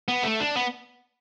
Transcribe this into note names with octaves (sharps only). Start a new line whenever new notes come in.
B3
A3
D4
B3